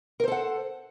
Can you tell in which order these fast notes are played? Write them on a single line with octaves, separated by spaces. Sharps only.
A#4 C5 A4 F#5